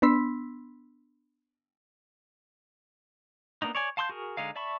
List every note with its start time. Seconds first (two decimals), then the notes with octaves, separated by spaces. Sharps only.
0.02 B3 D4 B5 C6 E6 B6
3.62 A#3 B3 D4 D#4
3.75 C#5 D5 G#5
3.97 F5 A5 C6 D6 G6
4.09 F#4 G#4 A#4
4.37 D3 G#3 D#4 F5
4.56 D5 E5 A5 B5 C#6